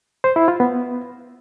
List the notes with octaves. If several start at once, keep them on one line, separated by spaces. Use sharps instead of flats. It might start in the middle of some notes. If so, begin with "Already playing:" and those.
C5
E4
F4
B3